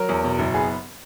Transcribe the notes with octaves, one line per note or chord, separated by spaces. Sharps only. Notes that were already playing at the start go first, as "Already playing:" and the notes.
Already playing: F#3 A#4
E2
B2
F#1
B3 G#4